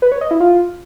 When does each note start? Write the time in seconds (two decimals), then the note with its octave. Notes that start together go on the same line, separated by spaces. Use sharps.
0.02 B4
0.12 C#5
0.21 D#5
0.31 E4
0.40 F4